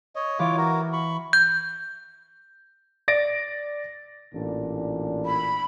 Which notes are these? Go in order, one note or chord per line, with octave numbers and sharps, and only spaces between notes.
C#5 D#5
E3 F4 C#5 D6
F#4 A#4
B5 C#6
G6
D5 A6 A#6 D7
A1 A#2 D4
B5